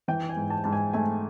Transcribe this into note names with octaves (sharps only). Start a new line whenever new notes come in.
E3 G5
G#5
G#2
A5
G#2 A5
G#5
A3 G#5